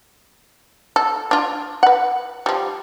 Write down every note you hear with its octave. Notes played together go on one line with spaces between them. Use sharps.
A4
D4 F4
B4 F#5
F3 G3